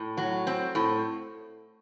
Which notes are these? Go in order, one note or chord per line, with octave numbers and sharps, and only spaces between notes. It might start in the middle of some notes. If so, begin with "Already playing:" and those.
Already playing: A2
F#3
C4
A2